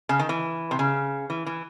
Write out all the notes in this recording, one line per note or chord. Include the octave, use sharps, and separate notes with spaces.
C#3
D#3
E3
C3
C#3
E3
E3